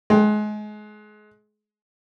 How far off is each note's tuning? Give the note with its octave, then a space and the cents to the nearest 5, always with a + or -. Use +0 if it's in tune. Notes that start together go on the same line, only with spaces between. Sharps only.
G#3 +30 G5 +0